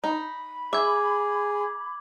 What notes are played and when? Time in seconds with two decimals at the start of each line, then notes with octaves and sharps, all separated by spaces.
0.04 D#4 B5
0.73 G#4 E5 D6 G#6